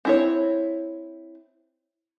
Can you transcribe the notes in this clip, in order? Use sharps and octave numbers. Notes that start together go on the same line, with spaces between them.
C4 E4 C#5